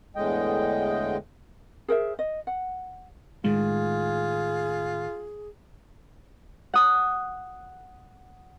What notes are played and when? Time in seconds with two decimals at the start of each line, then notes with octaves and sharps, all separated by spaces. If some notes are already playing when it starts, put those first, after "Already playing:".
0.16 E2 A2 D3 G#3 D#5 G5
1.88 G#4 A#4 C5 E5
2.19 D#5
2.47 F#5
3.44 A2 D#3 G#3 F4 G#4
6.74 F#5 D#6